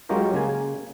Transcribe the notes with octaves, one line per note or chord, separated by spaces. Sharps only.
F#3 G#3 C#4 F4 G4 A#4
C#3 A#3 G#5